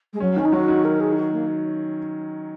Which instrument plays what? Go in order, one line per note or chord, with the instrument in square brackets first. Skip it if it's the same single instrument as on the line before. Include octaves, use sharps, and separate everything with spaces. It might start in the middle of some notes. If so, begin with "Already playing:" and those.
[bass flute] G#3
[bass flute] F#3 [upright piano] C#4
[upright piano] D#3 [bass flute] C#4
[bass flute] D#4
[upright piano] F#3 [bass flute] F#4
[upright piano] D#3
[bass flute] A#4
G#4
D#4
F#4
A#3